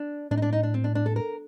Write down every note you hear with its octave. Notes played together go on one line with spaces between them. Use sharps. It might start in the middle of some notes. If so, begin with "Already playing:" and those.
Already playing: D4
A2 D4
D#4
D4
D#4
D4
C4
D4
D4
A4
A#4